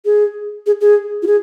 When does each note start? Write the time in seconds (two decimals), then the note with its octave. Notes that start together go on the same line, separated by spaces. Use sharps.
0.05 G#4
0.66 G#4
0.81 G#4
1.22 F4
1.26 G#4